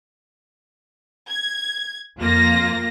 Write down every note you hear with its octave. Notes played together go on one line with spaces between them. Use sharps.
G#6
F2 A#3 F4 A#6